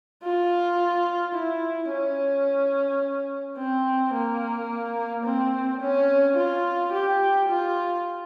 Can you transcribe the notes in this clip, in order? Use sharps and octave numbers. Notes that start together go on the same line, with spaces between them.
F4
E4
C#4
C4
A#3
C4
C#4
F4
G4
F4